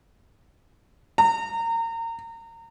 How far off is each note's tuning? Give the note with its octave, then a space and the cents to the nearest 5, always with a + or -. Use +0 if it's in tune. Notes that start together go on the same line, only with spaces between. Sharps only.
A#5 -30